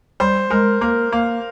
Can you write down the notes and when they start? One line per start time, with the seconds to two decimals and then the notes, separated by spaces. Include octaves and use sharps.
0.20 G3 C5
0.50 G#3 A#4
0.81 A#3 A#4
1.12 A#3 F5